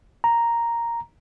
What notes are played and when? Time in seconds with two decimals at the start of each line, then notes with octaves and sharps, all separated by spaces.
0.24 A#5